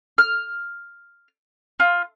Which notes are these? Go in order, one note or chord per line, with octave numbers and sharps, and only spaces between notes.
F6
F4